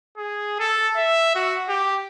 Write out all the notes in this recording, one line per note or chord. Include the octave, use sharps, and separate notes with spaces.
G#4
A4
E5
F#4
G4